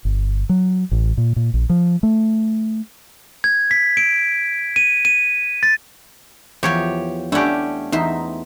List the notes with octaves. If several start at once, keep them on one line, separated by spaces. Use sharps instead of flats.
G1
F#3
A1
A#2
A#2
A#1
F3
A3
G#6
B6
D7
D#7
D#7
A6
E2 F3 G4 C#5
A3 C#4 D4 E4 G4 F#5
E2 D#4 C5 E5